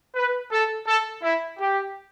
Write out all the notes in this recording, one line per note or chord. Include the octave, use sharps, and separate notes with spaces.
B4
A4
A4
E4
G4